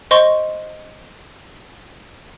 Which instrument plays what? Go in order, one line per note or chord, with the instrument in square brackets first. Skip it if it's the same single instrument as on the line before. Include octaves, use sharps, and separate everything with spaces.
[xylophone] C5 D#5 C6 C#6